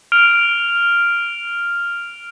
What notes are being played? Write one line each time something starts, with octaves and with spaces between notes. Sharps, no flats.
F6 D7 F7